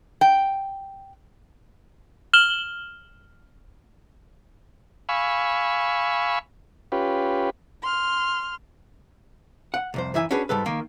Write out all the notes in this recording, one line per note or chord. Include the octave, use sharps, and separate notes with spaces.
G5
F6 E7 F#7 G7
F5 G#5 B5 C#6 E6
C#4 F4 G4 B4
C6 F6
F#5
C2 F2 C5
F#2 E3 E4 E5 G#5
C#4 D4 F#4 G#4 B4
G#2 G3 A4 B4
D#3 A#3